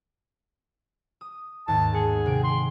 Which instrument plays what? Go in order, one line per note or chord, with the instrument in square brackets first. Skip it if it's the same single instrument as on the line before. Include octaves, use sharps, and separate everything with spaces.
[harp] D#6
[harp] D#2 G#2 [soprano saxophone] A5
[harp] B3 C#7 [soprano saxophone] G#4
[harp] C3 D7
[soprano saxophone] C6